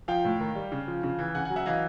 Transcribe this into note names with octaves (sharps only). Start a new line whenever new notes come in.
F3 F5 G5
A2
D#3
G3
C#3
F3
C#3
E3
C#3 F#5 G#5
F#5 G#5
F#3
E5 F#5
E3 D#5 F5